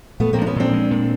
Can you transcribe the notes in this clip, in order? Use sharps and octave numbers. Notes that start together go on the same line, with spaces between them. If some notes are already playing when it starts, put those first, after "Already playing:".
A#2 A3 B3
A#3 C4
F3 D4
B3 C#4
A#2 C4 D4
G#3
A#2